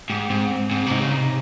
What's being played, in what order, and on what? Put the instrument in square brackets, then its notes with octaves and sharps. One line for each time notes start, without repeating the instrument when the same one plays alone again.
[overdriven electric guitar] G#2 [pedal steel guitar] G4
[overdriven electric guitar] G#2 [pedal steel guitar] C4
[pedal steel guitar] C4
[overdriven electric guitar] G#2 [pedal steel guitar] C4
[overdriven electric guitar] C3
[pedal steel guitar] D#4
[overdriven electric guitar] C#3
[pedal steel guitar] D#4
[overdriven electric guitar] C3